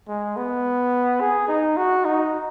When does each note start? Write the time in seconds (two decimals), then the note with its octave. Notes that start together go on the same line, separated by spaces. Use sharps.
0.08 G#3
0.37 B3
1.21 G#4
1.48 D#4
1.77 F#4
2.05 D#4